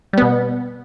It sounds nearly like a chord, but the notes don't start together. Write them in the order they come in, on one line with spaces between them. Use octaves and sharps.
G3 B3 B2